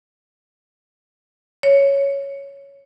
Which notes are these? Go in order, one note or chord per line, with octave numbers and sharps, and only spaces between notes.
C#5